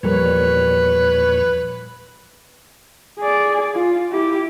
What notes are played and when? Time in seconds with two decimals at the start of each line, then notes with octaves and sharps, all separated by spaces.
0.03 E2 A#2 F3 G3 A#4 B4 C#5
3.20 G#4 D5
3.75 F4
4.12 E4 G4